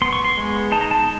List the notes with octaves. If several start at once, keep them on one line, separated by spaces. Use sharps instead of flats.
B3 C6
C#6
C6
G#3
D#4 A5
A#5
A5